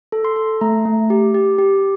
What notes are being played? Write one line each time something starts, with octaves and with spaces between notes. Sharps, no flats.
A4
C6
A4
A3 A#5
A3
G4
G4
G4